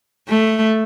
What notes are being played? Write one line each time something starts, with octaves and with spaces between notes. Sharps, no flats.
A3